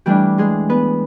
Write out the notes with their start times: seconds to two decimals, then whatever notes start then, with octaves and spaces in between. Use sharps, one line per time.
0.06 E3 G3 A3 D4 G4
0.38 G#3 G#4
0.70 B3 B4